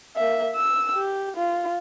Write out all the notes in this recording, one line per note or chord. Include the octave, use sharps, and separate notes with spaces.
A#3 E5
E6
G4
F4